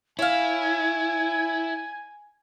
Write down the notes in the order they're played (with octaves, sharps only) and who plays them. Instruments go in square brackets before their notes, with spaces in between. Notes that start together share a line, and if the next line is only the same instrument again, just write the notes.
[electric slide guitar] E4 [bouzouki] C#5 F5 [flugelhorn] G#5 [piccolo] G#6